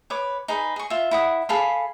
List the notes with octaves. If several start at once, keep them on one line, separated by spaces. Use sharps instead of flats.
B4 C#5 D6
D#4 G#4 B4
G#4 C#6
F4 E5
E4 F#5 D#6
G#4 A4 F5 B5